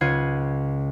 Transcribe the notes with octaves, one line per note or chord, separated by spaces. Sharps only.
C#2 F4 F#5 G#6 C7 D#7